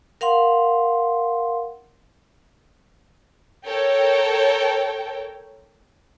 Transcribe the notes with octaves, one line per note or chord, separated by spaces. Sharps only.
A#4 F5 F#5 C6
A4 A#4 C#5 G5